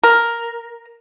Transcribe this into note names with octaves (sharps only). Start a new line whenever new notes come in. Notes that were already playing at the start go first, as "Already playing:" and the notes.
A#4